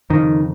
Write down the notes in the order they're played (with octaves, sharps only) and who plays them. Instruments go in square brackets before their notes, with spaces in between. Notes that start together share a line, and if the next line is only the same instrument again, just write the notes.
[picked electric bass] F2 D#3
C#3